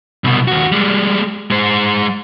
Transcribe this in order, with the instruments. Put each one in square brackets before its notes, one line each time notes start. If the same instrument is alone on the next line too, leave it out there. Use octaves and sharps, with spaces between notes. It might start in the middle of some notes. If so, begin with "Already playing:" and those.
[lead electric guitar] C2 B2
D#2 F#4
G3 G#3
G#3 C5